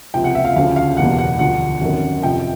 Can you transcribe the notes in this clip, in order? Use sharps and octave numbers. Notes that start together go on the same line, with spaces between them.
C#2 C3 F3 G5
F#5
E5
F5
D2 C#3 F3 F5
F5
F#1 E2 B2 G3 F#5
F#5
D2 D3 F3 F#5
G#1 F#2 D#3
F1 F2 C3 F3 G5